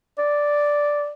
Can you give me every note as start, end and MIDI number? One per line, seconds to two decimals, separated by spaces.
0.18 1.12 74